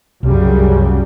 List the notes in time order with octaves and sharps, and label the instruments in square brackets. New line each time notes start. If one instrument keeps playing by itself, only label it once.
[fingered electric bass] C2 [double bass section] F#2 C#3 G3